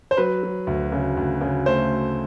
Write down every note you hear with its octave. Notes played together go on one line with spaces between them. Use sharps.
C5
F#3 B4
F#3
D2
C#3
D2
C#3
A3 C5